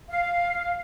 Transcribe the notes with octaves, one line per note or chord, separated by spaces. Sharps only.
F5